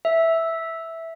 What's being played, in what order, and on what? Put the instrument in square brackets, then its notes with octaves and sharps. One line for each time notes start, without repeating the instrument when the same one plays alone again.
[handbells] E5